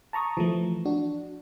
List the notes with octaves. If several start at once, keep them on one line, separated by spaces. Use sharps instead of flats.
A5 A#5 C#6 D#6
E3 F3 A3
D4 F#4